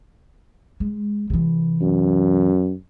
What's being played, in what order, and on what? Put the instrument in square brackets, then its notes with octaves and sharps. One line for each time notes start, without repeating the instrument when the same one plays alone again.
[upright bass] G#3
C3 E3
[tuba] F#2